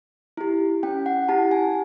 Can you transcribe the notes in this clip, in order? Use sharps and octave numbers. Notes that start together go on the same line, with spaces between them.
E4 G4
C#4 G5
F#5
E4 G4 A5
G#5